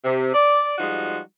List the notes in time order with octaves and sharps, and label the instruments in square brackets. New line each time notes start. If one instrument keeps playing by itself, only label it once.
[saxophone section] C3
D5
F3 G3 G#3 D#4 F#4